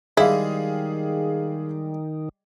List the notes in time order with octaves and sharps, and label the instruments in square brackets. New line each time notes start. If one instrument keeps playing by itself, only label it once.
[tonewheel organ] D#3 [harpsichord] G3 G#3 G4 [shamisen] E4 [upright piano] G#4 F5